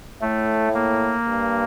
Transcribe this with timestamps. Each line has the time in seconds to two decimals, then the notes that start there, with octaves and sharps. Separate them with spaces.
0.21 A2 A3
0.75 A#3
1.27 G2